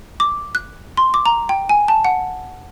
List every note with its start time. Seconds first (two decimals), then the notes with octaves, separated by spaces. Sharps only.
0.20 D6
0.55 F#6
0.97 C6
1.14 D6
1.26 A#5
1.49 G5
1.69 G#5
1.88 A5
2.05 F#5